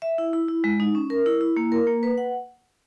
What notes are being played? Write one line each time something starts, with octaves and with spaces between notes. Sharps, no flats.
E5
E4
E4
E4
G#3
D#4
C#4
A#4
E4
E4
A#3
A#4
A#3
B4
F#5